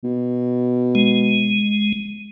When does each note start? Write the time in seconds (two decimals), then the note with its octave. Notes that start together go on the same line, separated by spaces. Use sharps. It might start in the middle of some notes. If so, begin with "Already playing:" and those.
0.04 B2
0.95 G#3